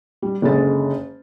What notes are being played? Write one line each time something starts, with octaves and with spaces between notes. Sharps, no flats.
G3
F#1 D3 G#3 A6